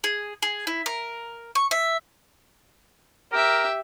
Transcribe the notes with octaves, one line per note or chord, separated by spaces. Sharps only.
G#4
G#4
E4
A#4
C#6
E5
G4 A#4 E5